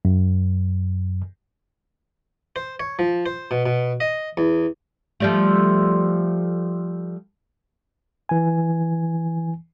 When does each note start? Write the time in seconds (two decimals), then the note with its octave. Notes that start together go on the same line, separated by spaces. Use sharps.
0.05 F#2
2.56 C5
2.80 C#5
2.99 F3
3.26 C5
3.51 B2
3.66 B2
4.00 D#5
4.37 E2
5.20 F3 G3 A3
8.29 E3 G#5